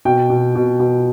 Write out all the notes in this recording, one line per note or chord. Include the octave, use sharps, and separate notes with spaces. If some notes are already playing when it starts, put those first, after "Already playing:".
B2 G5
B2
B2
B2